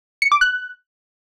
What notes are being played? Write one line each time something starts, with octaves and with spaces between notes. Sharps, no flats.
C#7
D6
F#6